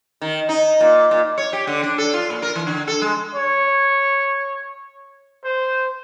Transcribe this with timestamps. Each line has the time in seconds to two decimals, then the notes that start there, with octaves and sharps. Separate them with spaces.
0.22 D#3
0.49 D#4
0.80 A#2
1.11 A#2
1.38 C#5
1.53 G4
1.67 D3
1.83 D4
1.98 A4
2.14 F4
2.30 A#2
2.42 A#4
2.56 E3
2.67 D3
2.88 A4
3.02 G#3
3.35 C#5
5.44 C5